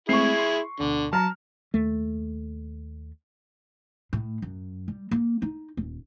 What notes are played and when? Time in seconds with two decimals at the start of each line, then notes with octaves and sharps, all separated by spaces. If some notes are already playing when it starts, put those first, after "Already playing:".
0.09 G#3 A3 C4 E4 G#4 C#6 C7
0.39 C6
0.80 D2 B2 D3
1.13 F#3 A5 A#5 F6
1.74 D#2 A3
4.13 A2
4.42 F#2
4.88 G3
5.11 A#3
5.42 D#4
5.77 D#1